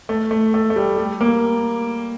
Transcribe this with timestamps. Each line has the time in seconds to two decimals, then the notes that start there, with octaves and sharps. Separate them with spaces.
0.09 A3
0.31 A3
0.54 A3
0.70 A3
0.76 G3
0.98 G3
1.21 A#3